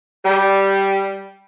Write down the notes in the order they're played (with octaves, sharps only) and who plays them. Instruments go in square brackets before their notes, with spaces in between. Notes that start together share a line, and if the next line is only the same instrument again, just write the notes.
[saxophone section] G3